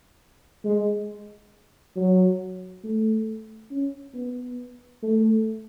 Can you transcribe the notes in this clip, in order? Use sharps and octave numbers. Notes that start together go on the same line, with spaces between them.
G#3
F#3
A3
C#4
B3
A3